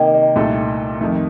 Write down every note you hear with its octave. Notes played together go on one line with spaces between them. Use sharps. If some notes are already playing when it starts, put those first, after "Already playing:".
Already playing: C3 D#3 A#3 D#5 G5
D#5
C2 A#2 A3 D#4 A4
F2 D#3 A3